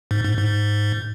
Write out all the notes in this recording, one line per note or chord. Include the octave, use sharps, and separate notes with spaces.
G#2
G#2
G#2